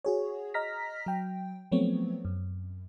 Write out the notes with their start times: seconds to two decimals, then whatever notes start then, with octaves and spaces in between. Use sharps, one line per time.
0.05 F#4 G#4 C#5
0.54 D#5 A#5 F6 A#6 B6
1.06 F#3 G5
1.72 F3 F#3 A3 B3 C4 C#5
2.25 F#2